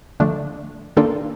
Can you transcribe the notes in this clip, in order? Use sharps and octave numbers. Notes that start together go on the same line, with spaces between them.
D3 F3 A3 D4
D#3 A#3 D4 F4 A4